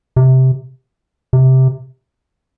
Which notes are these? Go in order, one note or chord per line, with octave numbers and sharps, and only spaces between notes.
C3
C3